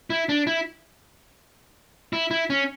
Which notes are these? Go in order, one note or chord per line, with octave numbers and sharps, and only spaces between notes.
E4
D4
E4
E4
E4
C#4